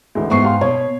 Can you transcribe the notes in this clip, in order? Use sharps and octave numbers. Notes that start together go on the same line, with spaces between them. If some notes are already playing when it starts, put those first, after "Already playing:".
D2 E3 G#3
G#2 B3 C5 E5 C#6 C7
G4 F5 C6
B2 C#5